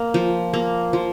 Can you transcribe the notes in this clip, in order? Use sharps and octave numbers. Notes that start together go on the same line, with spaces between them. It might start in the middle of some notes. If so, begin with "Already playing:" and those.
Already playing: A#3
F3
A#3
F3